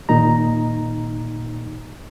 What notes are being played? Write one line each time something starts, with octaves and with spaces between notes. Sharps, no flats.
D#2 A#2 D#4 A#5